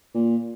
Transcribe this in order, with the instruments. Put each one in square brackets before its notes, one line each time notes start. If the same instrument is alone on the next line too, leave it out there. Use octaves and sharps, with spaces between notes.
[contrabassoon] A#2